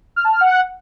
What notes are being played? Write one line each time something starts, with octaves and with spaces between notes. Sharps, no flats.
F6
A5
F6
F#5